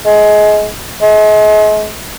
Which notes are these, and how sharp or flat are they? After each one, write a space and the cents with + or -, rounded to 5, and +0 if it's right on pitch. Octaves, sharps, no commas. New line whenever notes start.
G#3 +25
G#3 +40